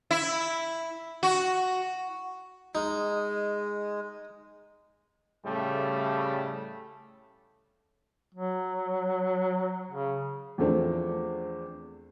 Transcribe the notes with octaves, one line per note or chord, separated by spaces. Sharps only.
E4
F#4
G#3 D#4
A2 C#3 G3 A3
F#3
C#3
E2 F3 A3 C4 D4